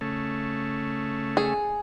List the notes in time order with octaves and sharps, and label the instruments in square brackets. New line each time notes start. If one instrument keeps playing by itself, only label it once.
[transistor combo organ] C#3 A3
[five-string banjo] G#4